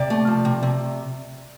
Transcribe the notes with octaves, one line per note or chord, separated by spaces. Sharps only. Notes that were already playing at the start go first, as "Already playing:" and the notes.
Already playing: C3 D5
A3
F3
C3
C3